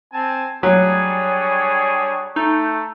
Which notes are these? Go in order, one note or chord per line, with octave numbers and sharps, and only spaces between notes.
C4 G#5 A5
F#3 G3 D4 G#4 C#5
A3 D#4